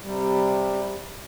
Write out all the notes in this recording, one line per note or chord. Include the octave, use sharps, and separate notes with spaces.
C3 G3